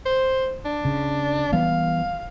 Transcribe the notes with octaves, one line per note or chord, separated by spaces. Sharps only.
C5
D4
C#3
E3 G3 B3 F5